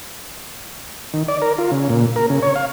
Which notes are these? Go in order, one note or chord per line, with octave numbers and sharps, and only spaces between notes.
D#3
D5
A#4
F4
C#3
A#2
A#4
C#3
C#5
F5